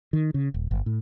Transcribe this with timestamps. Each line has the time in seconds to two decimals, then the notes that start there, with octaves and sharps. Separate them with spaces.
0.13 D#3
0.34 C#3
0.54 D#1
0.71 G1
0.86 A2